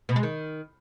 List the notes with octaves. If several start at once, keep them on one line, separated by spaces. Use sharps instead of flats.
B2
G#3
D#3